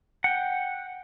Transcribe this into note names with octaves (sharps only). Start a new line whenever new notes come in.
F#5 G5